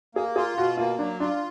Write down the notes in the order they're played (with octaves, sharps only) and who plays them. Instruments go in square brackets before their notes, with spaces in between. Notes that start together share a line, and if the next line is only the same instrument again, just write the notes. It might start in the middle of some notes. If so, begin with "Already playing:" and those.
[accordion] A#3 [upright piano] G#4
[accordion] F4 [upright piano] G#4
[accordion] B2 [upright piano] F#4
[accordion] A#3 [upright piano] F4
[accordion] F#3 [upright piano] D4
[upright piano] D4 [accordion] F4